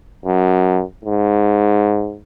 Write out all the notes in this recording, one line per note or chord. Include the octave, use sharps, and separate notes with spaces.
F#2
G#2